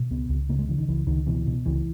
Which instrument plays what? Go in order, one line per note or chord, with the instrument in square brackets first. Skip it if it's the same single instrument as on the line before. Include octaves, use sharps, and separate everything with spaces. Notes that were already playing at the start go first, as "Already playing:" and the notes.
Already playing: [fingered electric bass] B2
C#2 B3
C#2
C#3 A#3
G#3
C#3 E3
D#3
C#2 E3
C#2 D#3
B2 E3
B2
C#2 E3